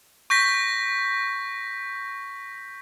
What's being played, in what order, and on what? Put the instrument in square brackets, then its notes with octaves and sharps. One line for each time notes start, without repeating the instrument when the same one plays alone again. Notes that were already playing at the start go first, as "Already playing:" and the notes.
[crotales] C#6 G6 A#6 B6